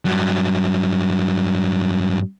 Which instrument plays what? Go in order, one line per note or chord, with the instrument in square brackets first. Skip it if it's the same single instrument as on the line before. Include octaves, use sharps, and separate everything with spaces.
[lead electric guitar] G2 F#3